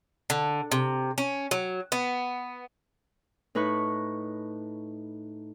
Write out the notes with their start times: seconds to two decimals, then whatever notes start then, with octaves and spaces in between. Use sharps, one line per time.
0.30 D3
0.72 C3
1.18 C#4
1.51 F#3
1.92 B3
3.55 A2 D#4 B4 C#6 F#6